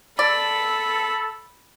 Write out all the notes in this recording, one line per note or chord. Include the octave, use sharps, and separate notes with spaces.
A4 D5 B5